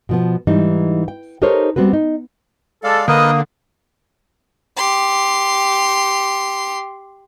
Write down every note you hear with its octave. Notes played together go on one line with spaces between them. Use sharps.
B2 F3 B3
G#2 E3 G3 D#4
G5
D#4 G4 A4 A#4 C5 C#5
G3 B3 C4 F#4 B4
D#4
G#3 A4 D5 F5
D3 A#3 A#4 B4 D#5 D#6
G4 C6